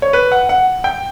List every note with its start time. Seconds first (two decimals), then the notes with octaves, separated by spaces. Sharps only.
0.02 C#5
0.13 B4
0.32 F#5
0.49 F#5
0.84 G5